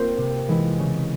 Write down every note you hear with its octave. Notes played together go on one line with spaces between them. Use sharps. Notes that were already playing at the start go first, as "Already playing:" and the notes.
Already playing: A#3 C4 F4 A#4 C5
C3
E3 G#3 E4
C#3